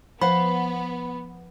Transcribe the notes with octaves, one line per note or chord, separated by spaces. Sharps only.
F3 B3 C5 F#5 B5